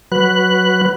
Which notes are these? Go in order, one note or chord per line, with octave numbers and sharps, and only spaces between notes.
F#3 B4 F#6